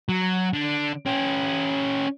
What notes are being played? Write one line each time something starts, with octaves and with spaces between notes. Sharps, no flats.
F#3
D3
C#4 G4